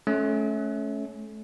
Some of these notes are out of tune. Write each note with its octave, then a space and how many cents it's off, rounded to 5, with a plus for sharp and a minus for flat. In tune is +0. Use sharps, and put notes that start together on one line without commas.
A3 -25 C#4 +0